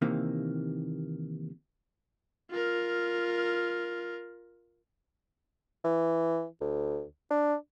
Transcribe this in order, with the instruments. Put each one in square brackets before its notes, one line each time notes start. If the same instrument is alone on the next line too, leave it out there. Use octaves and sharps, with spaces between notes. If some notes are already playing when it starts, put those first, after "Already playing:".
[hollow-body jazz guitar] D#2 C3 D#3 E3 A#3
[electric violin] F4 A#4
[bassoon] E3
D2
D4